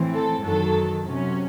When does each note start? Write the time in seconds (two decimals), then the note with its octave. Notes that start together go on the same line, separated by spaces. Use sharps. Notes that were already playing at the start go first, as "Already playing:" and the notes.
Already playing: A2 E3 C4
0.14 A4
0.44 F#2 D#3 F#3 A4
1.05 C3 F#3 C#4